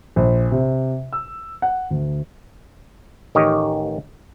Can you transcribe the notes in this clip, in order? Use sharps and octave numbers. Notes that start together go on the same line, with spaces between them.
A#1
C3
E6
F#5
D2
A1 D#3 D#4 G4 C#5 D#5